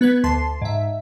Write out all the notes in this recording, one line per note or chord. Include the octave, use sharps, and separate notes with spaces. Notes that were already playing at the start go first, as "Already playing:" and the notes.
B3 B4 G#6 B6
D2 A5 C6 C7
G#2 E5